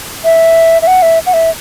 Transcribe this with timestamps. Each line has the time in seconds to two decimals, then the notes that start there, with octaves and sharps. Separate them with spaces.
0.25 E5
0.82 E5
0.87 F#5
1.02 E5
1.26 F#5
1.34 E5